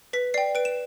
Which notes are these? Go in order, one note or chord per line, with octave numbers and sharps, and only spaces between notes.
B4 B6
D5 G5 C7
B4 D7
E7